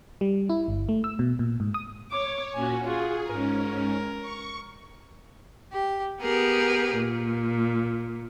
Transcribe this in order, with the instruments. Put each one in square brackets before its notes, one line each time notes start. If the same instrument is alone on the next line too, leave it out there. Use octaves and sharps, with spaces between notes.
[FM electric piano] G3
E4
G1
A3
E6
B2
A#2
G#2
D#6
[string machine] C#5 [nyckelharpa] D6
[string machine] A#2 C#4 F#4 [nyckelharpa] G#5
[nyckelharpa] F4 F#4 [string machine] G#4
[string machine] G#2 C#4 [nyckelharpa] A#4
[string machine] C#6
[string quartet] G4
B3 G4 G#4 A#4
A#2